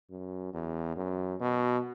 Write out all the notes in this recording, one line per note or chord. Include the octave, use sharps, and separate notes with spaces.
F#2
E2
F#2
B2